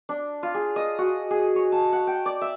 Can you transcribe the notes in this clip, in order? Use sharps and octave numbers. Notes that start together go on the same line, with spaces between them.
D4
F4
G#4
D#5
F#4
G#4
C#5
A5
F#5
G5
D5
E5